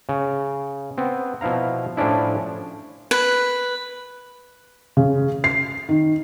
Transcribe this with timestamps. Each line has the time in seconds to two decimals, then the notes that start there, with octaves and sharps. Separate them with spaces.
0.09 C#3
0.98 B3 C4
1.41 B2 F3 E4 F5 A#5
1.97 A2 F3 C#4 D4 E4
3.11 B4
4.97 C#3
5.44 C7
5.89 D#3